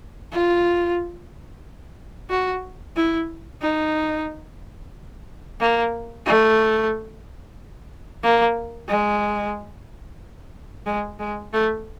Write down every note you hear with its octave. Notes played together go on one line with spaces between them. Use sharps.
F4
F#4
E4
D#4
A#3
A3
A#3
G#3
G#3
G#3
A3